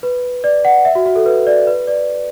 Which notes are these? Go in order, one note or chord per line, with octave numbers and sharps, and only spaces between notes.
B4
D5
F#5
E5
F#4
F#4
A4
B4
D5
B4
D5